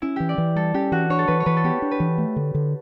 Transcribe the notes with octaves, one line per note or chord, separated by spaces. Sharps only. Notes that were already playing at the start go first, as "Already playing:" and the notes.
C#4 E4
E3 G4
D5
E3
G3 A4
C#4 G4
E3 F#4
D4 C#5
A4
E3 B4
C#5
E3 B4
A4
B3 G4
D4
B4
E3
A3
D3
D3